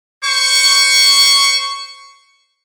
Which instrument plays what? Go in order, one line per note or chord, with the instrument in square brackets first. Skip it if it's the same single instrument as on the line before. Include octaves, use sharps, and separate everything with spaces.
[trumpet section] C5 C#6